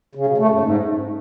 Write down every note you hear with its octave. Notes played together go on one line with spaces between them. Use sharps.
C#3
B2
A3
F#2
G#2